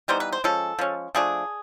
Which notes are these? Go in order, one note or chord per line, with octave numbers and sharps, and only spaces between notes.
E3 G3 B3 D#4 C5
B4
C5
F3 G#3 C#4 A4
F3 G#3 C#4
F3 A3 D4 G#4